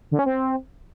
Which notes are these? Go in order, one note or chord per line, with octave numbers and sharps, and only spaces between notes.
D3
C#4
C4